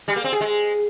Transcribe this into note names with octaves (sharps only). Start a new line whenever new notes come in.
G3
A#3
C4
G#4
G#3